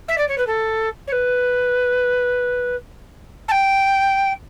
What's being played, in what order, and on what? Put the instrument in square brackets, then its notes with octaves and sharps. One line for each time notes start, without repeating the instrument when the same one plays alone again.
[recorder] E5
D5
C#5
B4
A4
C#5
B4
A5
G5